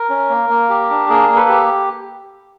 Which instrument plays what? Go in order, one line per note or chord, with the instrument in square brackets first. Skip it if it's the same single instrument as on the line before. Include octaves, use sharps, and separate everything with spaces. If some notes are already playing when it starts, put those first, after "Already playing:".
Already playing: [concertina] A#4
C#4
A#3
A#3
G4
D4
A#3 G#4 A#4
A#3
A4 B4
G4